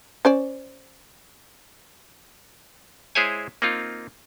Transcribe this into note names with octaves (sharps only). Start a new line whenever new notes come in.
C#4 C5 D5
G#3 E4 G#4 C5 C#5 G#5
A#3 C4 D#4 F4